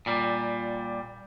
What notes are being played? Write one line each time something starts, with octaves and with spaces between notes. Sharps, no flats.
A#2 G3